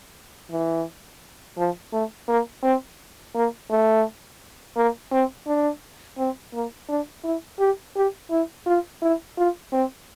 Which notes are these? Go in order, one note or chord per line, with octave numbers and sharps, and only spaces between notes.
E3
F3
A3
A#3
C4
A#3
A3
A#3
C4
D4
C4
A#3
D4
E4
G4
G4
E4
F4
E4
F4
C4